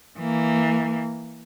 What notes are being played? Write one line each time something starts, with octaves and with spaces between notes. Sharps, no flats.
E3 A#3